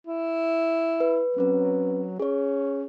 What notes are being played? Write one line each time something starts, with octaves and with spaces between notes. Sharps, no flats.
E4
B4
F#3 C4 C#4 B4
C#4 G#4 C#5